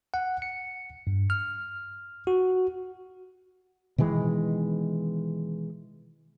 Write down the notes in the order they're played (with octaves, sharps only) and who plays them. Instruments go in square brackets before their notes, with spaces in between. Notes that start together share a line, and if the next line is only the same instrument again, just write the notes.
[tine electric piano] F#5
C#7
G2
F6
F#4
[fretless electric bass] B2 D#3 E3 G#3